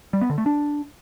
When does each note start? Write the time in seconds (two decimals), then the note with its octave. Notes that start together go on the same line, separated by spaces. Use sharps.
0.13 G3
0.21 B3
0.30 D3
0.38 A3
0.46 D4